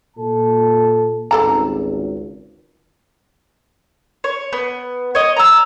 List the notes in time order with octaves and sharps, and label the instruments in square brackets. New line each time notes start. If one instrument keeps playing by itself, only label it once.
[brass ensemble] A#2 A4 A5
[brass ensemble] G#1 C#2 [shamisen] G3 A4 A#5
[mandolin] C#5
B3
C#5 D#5
A#5 E6